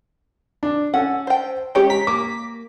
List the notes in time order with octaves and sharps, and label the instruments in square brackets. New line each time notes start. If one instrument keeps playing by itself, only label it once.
[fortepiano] D4
[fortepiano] C#4 A4 [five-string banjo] F#5
[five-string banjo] C5 G5
[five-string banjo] G#3 C#4 C#5 [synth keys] G4 G5
[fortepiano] A#5 [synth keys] B6
[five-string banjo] A#3 [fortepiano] D6